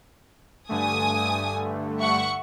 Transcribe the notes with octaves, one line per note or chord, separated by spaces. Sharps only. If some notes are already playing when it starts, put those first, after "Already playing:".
G2 D3 A3 G#5 D#6
E5 F#5 C#6